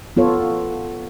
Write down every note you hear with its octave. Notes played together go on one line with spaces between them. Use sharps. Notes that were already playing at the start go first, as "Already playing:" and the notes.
B3 F4 A4 C#5